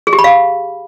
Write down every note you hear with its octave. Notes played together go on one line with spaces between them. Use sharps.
G#4
G4
B5
F5